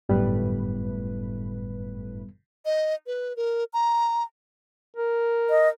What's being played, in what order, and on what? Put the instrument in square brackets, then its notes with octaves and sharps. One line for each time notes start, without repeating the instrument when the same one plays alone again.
[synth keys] G1 A2 B4 [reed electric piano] F#2 G3 B3
[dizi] D#5
B4
A#4
A#5
[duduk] A#4
[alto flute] D#5